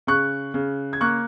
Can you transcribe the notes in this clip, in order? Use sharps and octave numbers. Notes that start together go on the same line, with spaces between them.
C#3 C#6 F#6
C#3
G#6
A#3 C#6 F#6